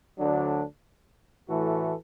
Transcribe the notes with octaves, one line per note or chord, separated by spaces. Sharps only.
D2 D3 F#3 D4
A2 E3 A3 F#4 A4